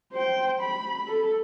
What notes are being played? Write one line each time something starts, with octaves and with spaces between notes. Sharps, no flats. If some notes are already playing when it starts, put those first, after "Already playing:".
C5 G5
B5
A4